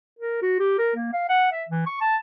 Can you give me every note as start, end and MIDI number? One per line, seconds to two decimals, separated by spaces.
0.19 0.39 70
0.42 0.58 66
0.59 0.75 67
0.78 0.92 70
0.96 1.11 58
1.13 1.26 77
1.29 1.48 78
1.52 1.63 76
1.69 1.85 52
1.86 1.99 85
2.01 2.16 81